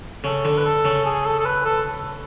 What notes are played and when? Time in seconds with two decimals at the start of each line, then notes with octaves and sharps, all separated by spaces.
0.24 C#3 A4
0.45 D3
0.58 B4
0.65 A4
0.85 C#3
1.05 G#4
1.25 A4
1.39 A4
1.45 B4
1.65 A4